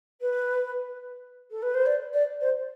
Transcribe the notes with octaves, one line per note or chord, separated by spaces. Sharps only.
B4
A4
B4
C5
D5
D5
C5